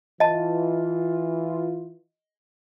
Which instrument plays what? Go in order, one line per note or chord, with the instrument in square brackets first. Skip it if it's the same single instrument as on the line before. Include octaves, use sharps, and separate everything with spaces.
[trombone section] E3 F4 [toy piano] D#5 A5